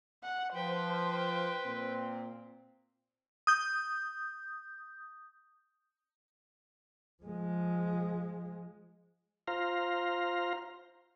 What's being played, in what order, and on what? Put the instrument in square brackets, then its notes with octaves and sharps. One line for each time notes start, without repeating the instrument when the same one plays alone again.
[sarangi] F#5
[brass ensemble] F3 [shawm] B4 [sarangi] C5 [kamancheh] G5
[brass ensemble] A#2 C4
[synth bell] D#6 G6
[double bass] F3 G#3
[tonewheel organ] F4 C5 F5 A#5